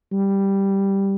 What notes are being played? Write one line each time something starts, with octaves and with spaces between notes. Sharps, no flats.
G3